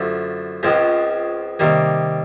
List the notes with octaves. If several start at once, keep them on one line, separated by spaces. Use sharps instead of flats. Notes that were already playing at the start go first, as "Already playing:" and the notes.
Already playing: F#2 D3 F3 A3
C#2 C#3 F3 G#3 C4
C3 D#3 G3 A#3